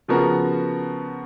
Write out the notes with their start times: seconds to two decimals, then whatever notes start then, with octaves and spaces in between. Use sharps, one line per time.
0.08 C#3 F3 B3 F#4 A#4